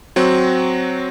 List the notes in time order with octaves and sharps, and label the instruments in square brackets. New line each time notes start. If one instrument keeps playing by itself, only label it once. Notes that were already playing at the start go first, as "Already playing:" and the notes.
[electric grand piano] F#3 C4 F#4